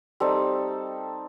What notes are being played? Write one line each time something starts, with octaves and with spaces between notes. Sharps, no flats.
G3 C4 D#4 A4